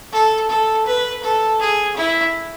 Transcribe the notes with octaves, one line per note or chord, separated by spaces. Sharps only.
A4
A4
B4
A4
G#4
E4